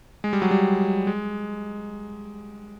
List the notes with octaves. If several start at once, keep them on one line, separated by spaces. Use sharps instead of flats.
G#3
G3
F#3
G3
G#3